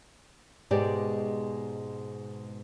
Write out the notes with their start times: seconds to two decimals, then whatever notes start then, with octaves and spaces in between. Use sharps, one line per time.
0.71 G#2 B2 G#3 G4 D5